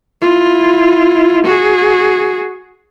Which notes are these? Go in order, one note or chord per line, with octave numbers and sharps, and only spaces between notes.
E4 F4
F#4 G#4